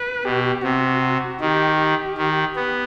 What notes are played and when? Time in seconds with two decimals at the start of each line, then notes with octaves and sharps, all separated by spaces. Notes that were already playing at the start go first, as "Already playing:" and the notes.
Already playing: B4
0.24 B2 G4
0.63 C3 F#4
1.41 D#3 G4
1.79 G4
2.18 D#3
2.56 B3 G4